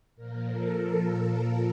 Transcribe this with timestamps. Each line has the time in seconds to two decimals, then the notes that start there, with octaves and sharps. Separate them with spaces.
0.16 A#2 F3 A#4
0.49 A4